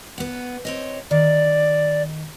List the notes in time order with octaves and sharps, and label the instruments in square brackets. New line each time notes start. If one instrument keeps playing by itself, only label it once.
[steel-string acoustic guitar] B3 F#5
C4 C#5 D#5
[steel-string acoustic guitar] D#3 [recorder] D5